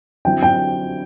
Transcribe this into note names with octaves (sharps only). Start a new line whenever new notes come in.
D3 F#3 C4 E4 G5
G5